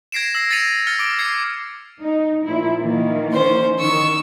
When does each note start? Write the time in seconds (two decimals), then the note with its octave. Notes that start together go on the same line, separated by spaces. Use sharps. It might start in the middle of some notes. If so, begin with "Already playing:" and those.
0.12 G#6 A#6 C7 D7 E7
0.35 E6 A#6 C7
0.51 A6 A#6 C7 C#7 D#7 F7
0.87 F6 A6 A#6 C#7
0.99 D6 D7
1.19 G#6 C7 C#7
2.00 D#4
2.45 A#2 F3 E4
2.80 D#3 E3 A#3
3.32 C#4 C5
3.79 D#3 C#6 E6